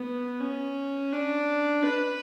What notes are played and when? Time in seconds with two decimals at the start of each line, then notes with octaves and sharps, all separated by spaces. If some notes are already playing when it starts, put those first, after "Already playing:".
Already playing: B3
0.40 C#4
1.13 D4
1.85 B4